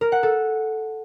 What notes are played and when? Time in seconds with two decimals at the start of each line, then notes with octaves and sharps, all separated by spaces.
0.01 A#4
0.12 F#5
0.23 A4